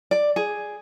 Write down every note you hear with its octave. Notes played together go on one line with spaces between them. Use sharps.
D5
G#4